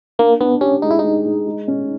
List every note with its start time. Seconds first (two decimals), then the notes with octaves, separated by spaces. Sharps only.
0.19 A#3 D4
0.41 B3 D4
0.61 C#4 G4
0.82 G#3 D#4
0.91 E4
0.99 G#3 D#4
1.25 G#3
1.46 G#3
1.68 C#4